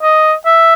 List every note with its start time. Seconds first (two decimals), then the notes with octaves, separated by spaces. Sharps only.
0.03 D#5
0.46 E5